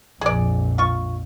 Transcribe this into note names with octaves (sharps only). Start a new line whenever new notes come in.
A#1 F2 G#4 D5
F4 C#6